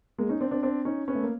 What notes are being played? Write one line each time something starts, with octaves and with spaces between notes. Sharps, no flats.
G#3 A#3
C#4 D#4
C4 D4
C4 D4
C4 D4
C#4 D#4
B3 C#4
A3
A#3